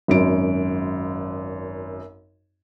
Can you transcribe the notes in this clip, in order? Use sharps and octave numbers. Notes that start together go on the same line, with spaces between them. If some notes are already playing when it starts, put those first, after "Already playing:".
G#1 F#2 D7